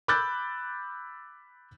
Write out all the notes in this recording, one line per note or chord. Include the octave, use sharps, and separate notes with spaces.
B5 D6 E6 F#6 G6 A6